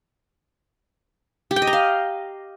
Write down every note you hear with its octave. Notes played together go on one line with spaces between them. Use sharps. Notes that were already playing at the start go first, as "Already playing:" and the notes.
G4
G5
D#5
A#5
F5